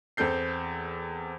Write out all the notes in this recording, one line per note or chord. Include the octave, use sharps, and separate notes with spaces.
E2 C4 A4 G6 C7